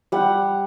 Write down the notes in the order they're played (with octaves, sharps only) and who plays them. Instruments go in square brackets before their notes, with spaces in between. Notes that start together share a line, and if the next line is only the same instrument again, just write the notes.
[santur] G3 F#5